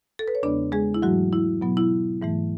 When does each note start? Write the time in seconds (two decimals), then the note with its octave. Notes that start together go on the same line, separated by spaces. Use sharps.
0.19 A4
0.28 B4
0.35 C#5
0.43 E2 C#3 G#3 B3 D4 D5
0.72 G#3 G#4
0.94 E4
1.02 G#2 E3 F#3 A3 F#4
1.33 E4
1.61 B2 F#3 B3
1.77 E4
2.22 G#2 E3 A3